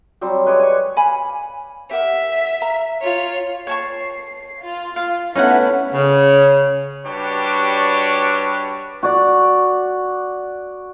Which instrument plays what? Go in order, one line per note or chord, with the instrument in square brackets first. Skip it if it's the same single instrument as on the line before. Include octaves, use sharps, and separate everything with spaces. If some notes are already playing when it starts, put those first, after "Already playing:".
[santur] F#3 G3 C4
G#3 B4 C#5 D5
G#5 C#6
[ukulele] F5 G#5 B5
[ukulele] G4 A#4 F#5 [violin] E5 B6
[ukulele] F5 A#5
[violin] F4 C#5
[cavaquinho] C#5 A5 C#6 [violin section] C7
[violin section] F4
[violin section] F4 [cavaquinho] F5
[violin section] A3 B3 E4 [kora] C#4 [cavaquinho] D#4 B4 F#5
[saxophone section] C#3
[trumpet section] G3 D4 F#4 G4 B4 C#5
[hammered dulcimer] F#4 D5